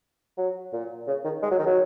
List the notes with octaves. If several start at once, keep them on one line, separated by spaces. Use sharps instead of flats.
F#3
A#2
C#3
D#3
G#3
F#3
D#3
F#3